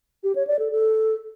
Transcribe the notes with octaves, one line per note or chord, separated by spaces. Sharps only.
G4
C#5
D5
A4
A4